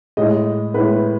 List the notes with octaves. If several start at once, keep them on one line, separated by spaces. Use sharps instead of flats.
A2 G#3 D#5
A2 G#3 B4